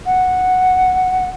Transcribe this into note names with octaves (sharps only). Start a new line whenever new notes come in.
F#5